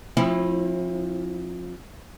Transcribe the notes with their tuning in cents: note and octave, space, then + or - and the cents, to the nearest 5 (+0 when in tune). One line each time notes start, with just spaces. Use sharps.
F3 +25 C4 +45 E4 +0